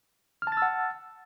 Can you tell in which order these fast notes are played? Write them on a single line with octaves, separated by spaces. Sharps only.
F6 A5 A6 E6 F#5